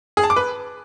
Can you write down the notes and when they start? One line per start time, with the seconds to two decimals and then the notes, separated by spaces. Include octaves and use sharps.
0.17 G#4
0.24 A5
0.30 D6
0.36 B4